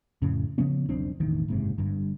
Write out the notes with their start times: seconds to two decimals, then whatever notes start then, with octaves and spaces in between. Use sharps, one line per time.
0.22 F2 A2 C#3
0.58 C#3 F3 B3 C#4
0.89 E1 B1 C4 D4
1.20 E1 A1 D#3
1.48 F#1 G#2 C3
1.78 G1 G2